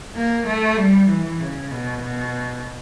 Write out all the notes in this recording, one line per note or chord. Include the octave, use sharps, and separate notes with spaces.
A#3
A3
G3
E3
C#3
B2
B2